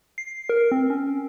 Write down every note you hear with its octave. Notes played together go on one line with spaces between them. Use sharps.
C7
A#4
C4
C#4